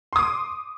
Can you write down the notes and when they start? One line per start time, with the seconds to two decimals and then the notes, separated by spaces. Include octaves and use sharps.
0.13 C6
0.16 D#6
0.19 D6